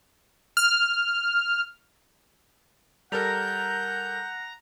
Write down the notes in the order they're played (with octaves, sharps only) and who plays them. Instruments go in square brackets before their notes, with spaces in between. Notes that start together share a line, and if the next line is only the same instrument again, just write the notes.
[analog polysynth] F6
[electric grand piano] G3 A4 A#4 [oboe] F#5 [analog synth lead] A#5 [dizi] G6